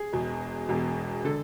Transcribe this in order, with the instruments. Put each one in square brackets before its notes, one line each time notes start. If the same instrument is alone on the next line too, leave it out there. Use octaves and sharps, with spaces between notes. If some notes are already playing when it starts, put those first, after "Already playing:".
Already playing: [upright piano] G#4
E1 E2 B2
E1 E2 B2
D3 A4